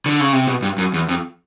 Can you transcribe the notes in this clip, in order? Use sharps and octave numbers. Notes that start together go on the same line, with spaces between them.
D3
C#3
C3
B2
G2
F#2
E2
F2